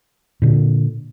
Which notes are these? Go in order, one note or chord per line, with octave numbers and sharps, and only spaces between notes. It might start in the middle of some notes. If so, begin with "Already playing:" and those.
A#2 D3